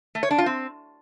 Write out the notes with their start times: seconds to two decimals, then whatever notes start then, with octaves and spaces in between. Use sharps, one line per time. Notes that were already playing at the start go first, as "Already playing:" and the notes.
0.15 A3
0.23 C#5
0.31 D4
0.38 F4
0.46 C4